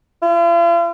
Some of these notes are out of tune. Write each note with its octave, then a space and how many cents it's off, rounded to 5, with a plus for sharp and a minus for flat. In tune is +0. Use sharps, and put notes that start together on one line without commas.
F4 -45